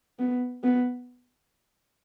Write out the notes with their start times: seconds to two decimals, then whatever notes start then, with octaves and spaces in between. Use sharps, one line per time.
0.19 B3
0.63 B3